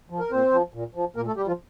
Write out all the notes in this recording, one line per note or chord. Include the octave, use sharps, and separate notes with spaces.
F3
A#4
A#2 C4 C5
F3
A#2
F3
A#2 A#3 A#4
A3 A4
G3 G4
F3 F4